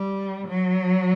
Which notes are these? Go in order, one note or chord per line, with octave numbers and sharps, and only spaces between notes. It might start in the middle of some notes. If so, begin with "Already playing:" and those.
Already playing: G3
F#3